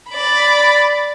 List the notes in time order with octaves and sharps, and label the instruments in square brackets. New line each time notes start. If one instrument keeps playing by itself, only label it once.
[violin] D5 B5